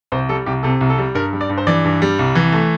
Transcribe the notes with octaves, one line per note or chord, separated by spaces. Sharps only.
C2 C5
G3 A4
C2 G4
C3 A4
C2
A4
G3
G2 A#4
G3
D5
G2
C5
E3 D5
G2
G3
C2
E3
A3